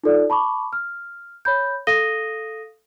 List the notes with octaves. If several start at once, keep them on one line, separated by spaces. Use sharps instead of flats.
D#4 F4 A4 D5
A5 B5 C#6 D6
F6
C#5 B5 G6
A4 F5 D#6 A#6 D#7 G7